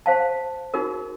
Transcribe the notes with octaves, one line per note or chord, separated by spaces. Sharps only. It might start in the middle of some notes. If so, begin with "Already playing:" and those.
C5 F5 A5
D#4 F#4 G#4 A#4